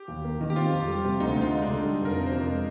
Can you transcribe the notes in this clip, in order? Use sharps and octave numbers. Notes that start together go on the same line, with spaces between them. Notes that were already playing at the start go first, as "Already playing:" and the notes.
Already playing: G4
D#2
A#3
D#3
G4
C4 F4
F2
G3
C3
D2 D#4
D2
F4
G#3
D4
D3
G3
F1 A#4
C3
C5
F2
G#3